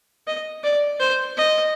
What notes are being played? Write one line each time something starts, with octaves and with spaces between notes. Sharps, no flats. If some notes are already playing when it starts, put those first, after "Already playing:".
D#5
D5
C5
D#5